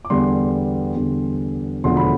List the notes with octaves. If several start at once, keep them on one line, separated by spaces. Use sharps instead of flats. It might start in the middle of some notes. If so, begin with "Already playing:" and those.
D6
E2 D3 G3 C6
E2 D3 G3
E1 D2 D3 F3 C6
B5